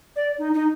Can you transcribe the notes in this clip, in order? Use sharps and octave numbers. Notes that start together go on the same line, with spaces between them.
D5
D#4
D#4